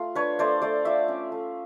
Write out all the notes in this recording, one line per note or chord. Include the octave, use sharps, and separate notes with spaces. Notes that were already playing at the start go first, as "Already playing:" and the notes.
Already playing: A3 F4
D4 B4 C#5
A3 C5 D5
A3 C5 D5
F4 D5 E5
C#4
A3